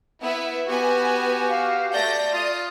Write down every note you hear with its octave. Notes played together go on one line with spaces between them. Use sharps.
B3 E4 E5
B3 F#4 G4 G#5
F5
A3 D5 G6 A#6
F4 F5 D#6